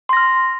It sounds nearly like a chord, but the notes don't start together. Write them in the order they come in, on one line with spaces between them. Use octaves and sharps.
C6 A#6 F6